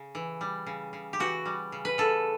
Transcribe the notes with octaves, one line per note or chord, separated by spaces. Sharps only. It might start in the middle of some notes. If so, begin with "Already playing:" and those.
Already playing: C#3
E3
G3
C#3
C#3
G4
E3 F#4
G3
C#3
B4
C#3 A4